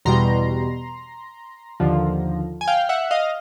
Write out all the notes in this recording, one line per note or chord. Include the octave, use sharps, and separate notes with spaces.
E2 B2 G3 A#5 C6
D#2 D3 F3
G#5
F5 G5
E5 F#5
D#5 F5